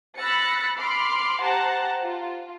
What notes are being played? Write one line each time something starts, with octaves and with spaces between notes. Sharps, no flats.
B5 E6 F#6 A6 A#6 C#7
B5 C6 D6 F6 C7
G4 C5 F#5 A5 A#5 F#6
F4